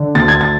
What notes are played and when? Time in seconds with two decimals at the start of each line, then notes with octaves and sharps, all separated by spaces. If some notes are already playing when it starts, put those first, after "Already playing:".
Already playing: D3
0.15 D2 A6
0.28 G#6
0.41 A6